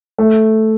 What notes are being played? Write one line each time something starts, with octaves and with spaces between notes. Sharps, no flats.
A3